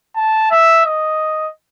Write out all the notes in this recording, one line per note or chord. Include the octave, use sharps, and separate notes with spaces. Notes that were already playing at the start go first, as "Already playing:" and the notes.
A5
E5
D#5